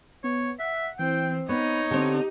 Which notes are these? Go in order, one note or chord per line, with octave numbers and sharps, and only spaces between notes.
B3 C#5
E5 F#5
E3 C4 G5
B3 D#4 C#5 B5
D3 C4 G4